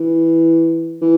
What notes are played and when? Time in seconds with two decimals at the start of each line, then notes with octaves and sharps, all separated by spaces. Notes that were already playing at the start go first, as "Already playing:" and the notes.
Already playing: E3
1.01 E3